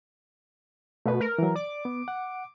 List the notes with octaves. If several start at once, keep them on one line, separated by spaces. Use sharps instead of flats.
B2 A3 B4
A#4
E3 F#3
D5 D6
B3
F#5